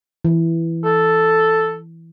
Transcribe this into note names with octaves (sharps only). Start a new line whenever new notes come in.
E3
A4